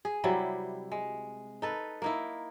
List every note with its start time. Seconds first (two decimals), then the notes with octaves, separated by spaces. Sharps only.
0.05 G#4
0.24 C3 F#3 G3 E4
0.92 G#3
1.62 D#4 A4 B4
2.02 A#3 D#4 E4